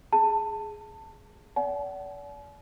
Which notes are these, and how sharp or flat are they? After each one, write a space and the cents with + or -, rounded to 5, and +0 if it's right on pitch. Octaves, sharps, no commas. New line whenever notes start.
G#4 +5 A5 +20
D5 -35 F#5 +30 A5 -45